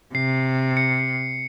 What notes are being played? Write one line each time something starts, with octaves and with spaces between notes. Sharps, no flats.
C3 C7
C#7